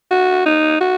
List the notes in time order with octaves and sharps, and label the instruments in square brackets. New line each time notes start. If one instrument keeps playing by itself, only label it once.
[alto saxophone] F#4
D#4
F#4